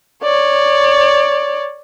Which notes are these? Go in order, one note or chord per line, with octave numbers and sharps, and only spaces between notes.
C#5 D5